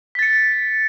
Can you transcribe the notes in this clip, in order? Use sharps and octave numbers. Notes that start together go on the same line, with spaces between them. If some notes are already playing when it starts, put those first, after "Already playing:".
A6 B6 C#7